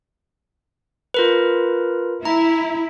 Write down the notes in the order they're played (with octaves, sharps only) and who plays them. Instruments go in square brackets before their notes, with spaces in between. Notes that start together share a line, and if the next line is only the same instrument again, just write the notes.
[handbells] F4 A#4 B4
[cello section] E4 [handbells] A#5